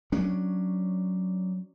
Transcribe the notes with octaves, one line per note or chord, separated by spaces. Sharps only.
F#3 C#4 D4